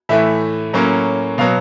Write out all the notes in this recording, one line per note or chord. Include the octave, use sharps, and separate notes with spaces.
A2 E3 A3 E5
A2 F#3 A#3 C#4
B2 F#3 B3 F5